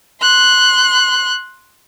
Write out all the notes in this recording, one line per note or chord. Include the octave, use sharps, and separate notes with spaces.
C6 F#6